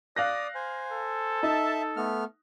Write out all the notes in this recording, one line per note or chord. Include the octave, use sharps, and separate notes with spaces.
D5 F5 D#6 F#6 A#6
C5 G#5
A4
D#4 E5 A5
A3 B3 F6